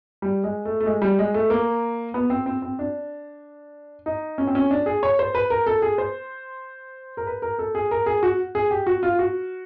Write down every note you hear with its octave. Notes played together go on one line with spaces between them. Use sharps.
G3
G#3
A3
A3
G#3
G3
G#3
A3
A#3
B3
C4
C4
C4
D4
D#4
C#4
C4
C#4
D4
G#4
C#5
C5
B4
A#4
A4
G#4
C5
A#4
B4
A#4
A4
G#4
A#4
G#4
F#4
G#4
G4
F#4
F4
F#4